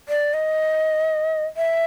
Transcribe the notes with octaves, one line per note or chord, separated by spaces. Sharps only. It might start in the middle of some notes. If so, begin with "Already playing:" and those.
D5
D#5
E5